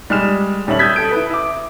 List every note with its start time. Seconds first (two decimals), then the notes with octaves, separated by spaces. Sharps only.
0.10 G3 G#3 F6 E7
0.67 D#1 G3 C#4 E5 F#7
0.79 D#6 E6 G6 G#6 B6
0.96 A4 D#6 G6 D7
1.11 E4 B4
1.30 E5 D6